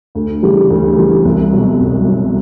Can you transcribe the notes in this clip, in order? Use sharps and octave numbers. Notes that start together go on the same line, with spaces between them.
D2
C#3 E3 G3
D2
C#3 E3 G3
C2
B2 F#3
C2
B2 F#3